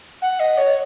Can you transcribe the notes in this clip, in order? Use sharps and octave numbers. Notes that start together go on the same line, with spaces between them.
F#5
D#5
C#5